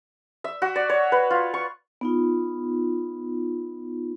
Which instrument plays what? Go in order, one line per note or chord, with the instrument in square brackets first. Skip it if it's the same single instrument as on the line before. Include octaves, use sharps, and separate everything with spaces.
[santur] E5
F#4
D5
C#5
B4
F4
C#6
[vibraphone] B3 D#4 F4